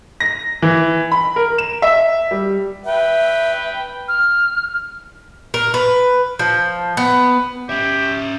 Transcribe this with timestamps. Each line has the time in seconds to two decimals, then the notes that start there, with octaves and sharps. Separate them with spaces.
0.20 A#6
0.62 E3
1.12 B5
1.36 A#4
1.58 E7
1.82 E5
2.31 G3
2.85 B4 E5 G5
4.08 F6
5.54 A#4
5.74 B4
6.39 F3
6.97 B3
7.69 C#4 G4 E5